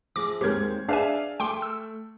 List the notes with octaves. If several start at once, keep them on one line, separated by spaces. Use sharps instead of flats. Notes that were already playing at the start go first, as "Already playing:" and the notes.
F3 G#4 E5 D6 A#6
D#2 G#3 C4 G4 A#4 C#5 G#6
D4 G#4 B4 D5 E5 F5 G#5
A3 G5 C6 D6
E6